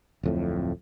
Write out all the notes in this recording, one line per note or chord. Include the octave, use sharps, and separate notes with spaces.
D1 F2 A2